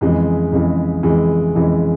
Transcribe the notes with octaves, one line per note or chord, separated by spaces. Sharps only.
F2 C#3 E3 G#3
F2 C#3 E3 G#3
F2 C#3 E3 G#3
F2 C#3 E3 G#3